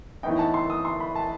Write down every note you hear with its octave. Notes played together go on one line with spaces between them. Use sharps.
A2 E3 B3 D#4 G5
A5
C6
D#6
C6
B5
A5